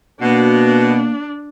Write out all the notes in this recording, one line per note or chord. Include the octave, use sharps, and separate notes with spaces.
B2 A#3 D4